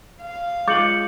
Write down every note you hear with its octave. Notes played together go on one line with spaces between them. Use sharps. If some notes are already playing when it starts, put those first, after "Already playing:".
F5
G#3 F4 D6 G6 C#7 F#7